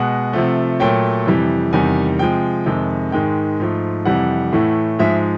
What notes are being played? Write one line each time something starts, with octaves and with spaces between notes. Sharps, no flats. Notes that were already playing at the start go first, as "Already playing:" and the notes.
Already playing: B2 G#3 F#5
C3 F3 A3
A#2 F#3 A3 G5
F2 C3 E3 G3
E2 C3 D#3 G3 G#5
C3 F3 G#3 G5
F2 C3 D#3 G#3
G#2 D#3 G#3 G5
G#2 F3 A3
F2 C3 E3 G3 F#5
A2 E3 A3
G#2 F3 G#3 E5